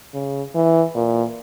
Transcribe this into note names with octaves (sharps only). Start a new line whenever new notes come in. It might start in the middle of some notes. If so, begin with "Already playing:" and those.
C#3
E3
A#2